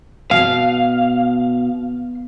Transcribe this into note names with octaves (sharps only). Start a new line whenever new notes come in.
B2 F5